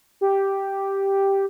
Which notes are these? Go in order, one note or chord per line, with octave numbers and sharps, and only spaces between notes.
G4